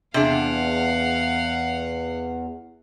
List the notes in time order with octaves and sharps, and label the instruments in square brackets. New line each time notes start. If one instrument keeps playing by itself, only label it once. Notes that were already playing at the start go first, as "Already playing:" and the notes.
[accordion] E2 [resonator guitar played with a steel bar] C3 D4 G#4 [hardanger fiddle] F5 F#5